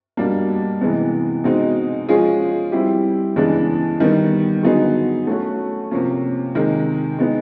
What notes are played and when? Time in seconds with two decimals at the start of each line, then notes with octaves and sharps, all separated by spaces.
0.17 B2 G3 A#3 D4
0.81 C3 E3 G#3 B3
1.44 B2 G#3 C4 D#4
2.08 F3 G#3 C#4 F4 G#4
2.72 G3 C4 E4 G4
3.36 C#3 E3 G#3 B3 D4
4.00 D#3 G3 B3
4.63 D3 F#3 B3 D#4 G#4
5.27 A3 C#4 F#4
5.91 C3 F3 A#3 C#4
6.55 C3 D#3 G#3
7.19 G#3 B3 D#4